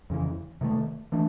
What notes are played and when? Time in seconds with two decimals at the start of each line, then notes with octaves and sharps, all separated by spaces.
0.10 F2 C#3 E3
0.61 C3 D#3 F#3 A3
1.12 E3 A3 D4